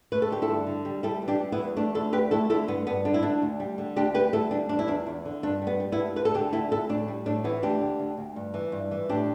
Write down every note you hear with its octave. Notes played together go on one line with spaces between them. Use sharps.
A3 B4
A4
D3 G4
E4 A4
G2
D3
G3
G3 E4 A4
E3
D4 G4
G3
B3 E4
E2
A3 D4
D3 E4 A4
D2 G4 B4
A3 E4 A4
D3 E4 A4
G2 B3
G2 B3
D3 D4
E4
D3 D4
D2
G3
D3
D2 D4 G4
G3 G4 B4
D2 E4 A4
G3 D4
E2 D4
E4
E2 D4
E2
D3
G2 D4
G3
B3
G3
B3 E4
G2
D2 B4
A4
D3 D4 G4
D2 E4 A4
D2 E4 A4
A2 D4
G3
A2 D4
E3 B3 E4
D2 D4 G4
D3
D2
D2
G2
E3
G2
E3
A2 D4 G4